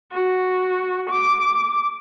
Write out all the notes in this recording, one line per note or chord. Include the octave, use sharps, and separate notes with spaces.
F#4
D6